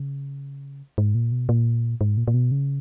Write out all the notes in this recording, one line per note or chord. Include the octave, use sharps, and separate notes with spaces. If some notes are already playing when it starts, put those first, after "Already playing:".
Already playing: C#3
G#2
A#2
B2
A#2
G#2
A#2
A#2
B2
C#3